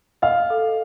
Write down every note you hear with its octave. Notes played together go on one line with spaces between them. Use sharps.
D#5 F5
A4